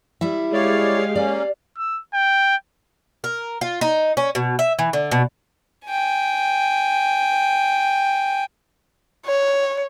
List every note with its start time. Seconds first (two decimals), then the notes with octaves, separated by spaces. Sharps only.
0.21 G3 E4 E5
0.53 G#3 G4 G#4 C#5 D5 F5
1.15 A#3 C#4 D5
1.77 E6
2.14 G5
3.24 A#4
3.61 F4
3.81 D#4
4.17 C#4
4.35 B2
4.59 E5
4.79 E3
4.93 D3
5.11 B2
5.87 G5 G#5
9.26 C#5